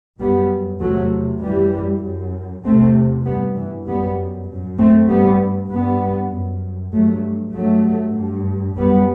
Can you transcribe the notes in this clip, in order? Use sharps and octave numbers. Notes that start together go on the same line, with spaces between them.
F#2 G3 B3
E2 C3 F#3 A3
F#2 E3 G3
F#2
E2 C3 A3 C4
G2 G3 B3
E3
F#2 G3 B3
F#2
A3 C4
G2 G3 B3
G2 G3 B3
F#2
G2 F#3 A3
G2 F#3 A3
G2
F#2 G3 B3